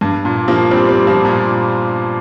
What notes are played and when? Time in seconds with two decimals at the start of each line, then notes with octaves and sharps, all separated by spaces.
0.01 G2
0.25 A#2
0.48 F3 A#3
0.71 G3 C4
0.89 G3 C4
1.07 F3 A#3
1.25 A#2